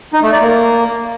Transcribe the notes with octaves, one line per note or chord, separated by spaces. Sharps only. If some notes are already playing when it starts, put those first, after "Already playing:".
D#4
A3
D5
A#3